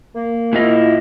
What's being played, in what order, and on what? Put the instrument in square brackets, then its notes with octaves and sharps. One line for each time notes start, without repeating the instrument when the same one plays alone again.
[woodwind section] A#3
[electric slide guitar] A#2 F4 D#5 [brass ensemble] E4